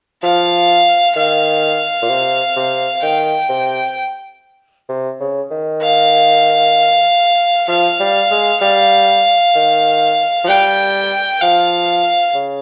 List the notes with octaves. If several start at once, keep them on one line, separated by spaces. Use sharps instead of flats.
F3 F5
D#3 F5
A#2
C3
C3
D#3 G5
C3
C3
C#3
D#3
F5
F3 F5
G3
G#3
G3 F5
D#3
F3
G3 G5
F3 F5
C#3